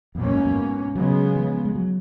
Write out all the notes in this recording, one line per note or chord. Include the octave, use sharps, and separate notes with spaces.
F2 B2 A#3 C#4
F#2
G#2
F#2
G#2
C#3 F#3 G#3 B3
F3
G#3
F#3